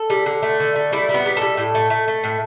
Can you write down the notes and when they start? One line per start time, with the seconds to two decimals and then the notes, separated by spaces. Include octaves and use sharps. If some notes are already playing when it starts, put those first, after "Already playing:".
Already playing: A4
0.10 G3
0.26 D3
0.42 A3
0.60 D3
0.76 A3
0.92 G3 E4
1.09 G3
1.14 B3
1.26 G3
1.37 G3 A4
1.57 A2
1.75 A3
1.90 A3
2.08 A3
2.23 A2